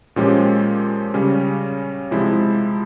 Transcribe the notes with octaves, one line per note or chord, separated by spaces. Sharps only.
A#2 F3 G#3 C#4 G4
C#3 G3 C#4
C3 F3 G#3 E4